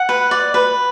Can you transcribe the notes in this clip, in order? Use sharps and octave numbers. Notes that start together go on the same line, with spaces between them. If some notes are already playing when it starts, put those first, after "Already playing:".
Already playing: F#5
B4
D5
B4